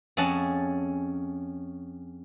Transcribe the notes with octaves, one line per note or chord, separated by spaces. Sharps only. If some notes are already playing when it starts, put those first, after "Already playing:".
F2 C#4 G#4 F#5 A5